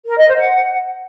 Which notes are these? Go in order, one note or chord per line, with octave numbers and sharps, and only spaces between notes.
A#4
D#5
C5
F#5